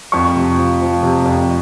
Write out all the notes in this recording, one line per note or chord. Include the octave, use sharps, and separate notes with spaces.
F2 C#6
C3
F3
F3
C3
F2